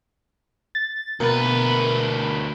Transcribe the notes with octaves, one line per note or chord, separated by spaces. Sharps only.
A6
D2 B2 A#3 A#4 B4